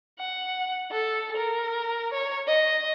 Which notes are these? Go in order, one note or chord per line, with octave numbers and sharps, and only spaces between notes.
F#5
A4
A#4
C#5
D#5